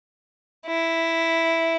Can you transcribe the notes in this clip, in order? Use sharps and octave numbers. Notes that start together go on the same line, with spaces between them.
E4